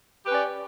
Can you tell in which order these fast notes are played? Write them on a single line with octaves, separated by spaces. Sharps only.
G4 B4 C#4 D5